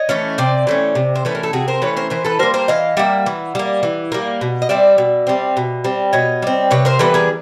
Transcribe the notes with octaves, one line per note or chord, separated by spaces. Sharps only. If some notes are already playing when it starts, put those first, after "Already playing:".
Already playing: C#5 D#5
E3 A3 C#4
C3 C5 D5
E3 A3 C#4
C3
C5
E3 A3 C#4 B4
A#4
A4
C3 F#4 G#4
A#4 C5
E3 A3 C#4 B4 C#5
A#4 C5
E3 A#4 C5
A4 B4
G3 A#3 A#4 C5
A#4 C5
E3 D#5 F5
G3 A#3 E5 F#5
E3
G3 A#3
E3
G3 A#3
B2
D#5
G3 C4 D5 E5
B2
G3 C4
B2
G3 C4
B2 C#5 D#5
G3 C4
C3 B4 C#5
A#4 C5
E3 G3 B3 A4 B4
G#4 A#4